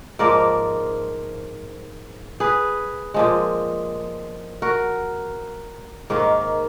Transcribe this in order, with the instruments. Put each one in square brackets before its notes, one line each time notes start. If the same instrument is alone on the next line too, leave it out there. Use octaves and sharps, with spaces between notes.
[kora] G#2 F3 A#3 A#4 D5
G#4 B4
A#2 F3 G#3
F#4 A#4
G#2 D#3 A#3